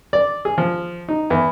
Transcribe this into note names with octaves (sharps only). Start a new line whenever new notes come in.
D5
G#4
F3
D#4
E2